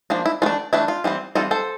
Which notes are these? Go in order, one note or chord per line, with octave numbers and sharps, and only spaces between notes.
F3 A#3 D4
E4
E3 A3 D4 F4
E3 A3 D4 E4
F4
E3 G3 C4
E3 G3 C4 F4 A4
A4 C5